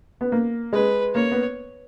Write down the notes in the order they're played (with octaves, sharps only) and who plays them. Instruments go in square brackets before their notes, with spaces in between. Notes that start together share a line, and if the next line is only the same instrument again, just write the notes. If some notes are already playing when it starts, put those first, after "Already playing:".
[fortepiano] B3
A#3
[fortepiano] G#3 [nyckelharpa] B4
[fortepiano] A#3 [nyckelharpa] C#5
[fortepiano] B3